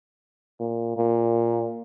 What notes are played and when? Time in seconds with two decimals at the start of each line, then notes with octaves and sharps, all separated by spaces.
0.60 A#2
0.97 A#2